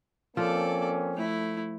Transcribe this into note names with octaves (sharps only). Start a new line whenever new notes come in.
F3 A#3 C4 C#4 A4 D5
A3 E4